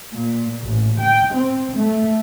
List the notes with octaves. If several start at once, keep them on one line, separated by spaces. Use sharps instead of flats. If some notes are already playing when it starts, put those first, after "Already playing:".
A#2
A1
G5
C4
A3